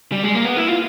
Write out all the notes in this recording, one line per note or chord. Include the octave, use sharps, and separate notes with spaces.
G3
G#3
A#3
B3
E4
F4